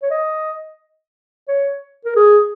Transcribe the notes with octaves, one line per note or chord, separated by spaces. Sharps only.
C#5
D#5
C#5
A#4
G#4